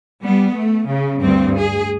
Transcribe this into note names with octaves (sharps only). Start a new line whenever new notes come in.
G3 B3
A3
C#3
D2 G2 C4
G#4